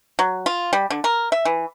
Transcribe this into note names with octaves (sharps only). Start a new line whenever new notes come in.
F#3
F4
G3
D3
A#4
E5
E3